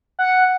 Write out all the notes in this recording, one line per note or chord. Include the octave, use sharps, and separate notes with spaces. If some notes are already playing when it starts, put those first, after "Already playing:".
F#5